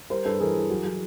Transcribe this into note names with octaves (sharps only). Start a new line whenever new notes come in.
G3 A#4 C5
G2 A4 B4
E3 G#4 A#4
E3
F#3
F#3